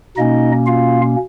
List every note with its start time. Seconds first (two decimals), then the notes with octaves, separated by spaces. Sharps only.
0.17 B2 A#3 C#4 D#4 D#5
0.67 F4 F5